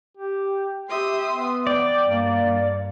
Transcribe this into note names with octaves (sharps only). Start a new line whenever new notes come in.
G4
G4 E5 C6 D#6
B3
D5 G5
G2 A#3
G2